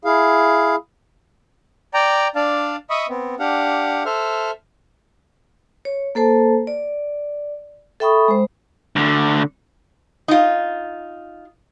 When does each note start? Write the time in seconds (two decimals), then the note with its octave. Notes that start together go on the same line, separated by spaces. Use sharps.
0.05 E4 G#4 F5
1.94 D5 G5 A#5
2.35 D4 D5 F5 A5
2.90 D#5 E5 B5 C#6 D#6
3.09 B3 C4
3.39 D4 G4 F5 F#5
4.05 A4 C5 E5 F6
5.85 C#5
6.15 A#3 A4 C5 A5
6.67 D5
8.00 A4 E5 G5 B5 C#6 D#6
8.28 G#3 C5
8.96 D2 D3
10.28 D#4 F4